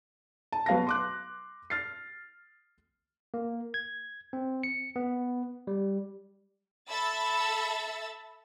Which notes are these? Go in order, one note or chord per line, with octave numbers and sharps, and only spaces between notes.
A5
F#3 B3 F5 A5 A#6
C6 D6 F#6
F6 A6 C7
A#3
G#6
C4
C#7
B3
G3
A4 E5 B5 E6 A6